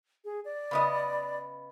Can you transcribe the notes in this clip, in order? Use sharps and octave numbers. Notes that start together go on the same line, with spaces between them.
G#4
D5
C#3 B3 D#5